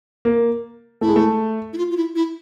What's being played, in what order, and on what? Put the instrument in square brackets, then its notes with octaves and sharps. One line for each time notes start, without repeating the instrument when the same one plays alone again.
[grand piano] A#3
[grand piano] A3 [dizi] E4
[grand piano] G#3
A3
[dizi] E4
F4
F4
E4
E4